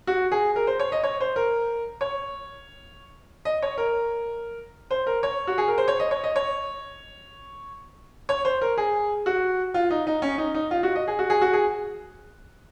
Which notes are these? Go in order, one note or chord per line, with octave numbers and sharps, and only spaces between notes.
F#4
G#4
A#4
C5
C#5
D#5
C#5
C5
A#4
C#5
D#5
C#5
A#4
C5
A#4
C#5
F#4
G#4
A#4
C5
C#5
D#5
C#5
D#5
C#5
C#5
C5
A#4
G#4
F#4
F4
D#4
D#4
C#4
D#4
D#4
F4
F#4
D#5
G#4
F#4
G#4
F#4
G#4